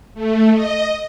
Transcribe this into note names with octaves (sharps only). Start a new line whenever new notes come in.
A3
D#5